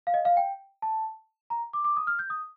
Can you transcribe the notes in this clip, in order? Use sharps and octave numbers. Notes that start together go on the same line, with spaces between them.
F5
D#5
F5
G5
A5
A#5
D6
D6
D#6
F6
G6
D#6